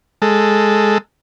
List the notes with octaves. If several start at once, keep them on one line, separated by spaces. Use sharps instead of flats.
G#3 A4